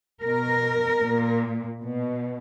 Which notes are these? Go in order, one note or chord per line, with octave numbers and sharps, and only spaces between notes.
B2 A#4
A#2
B2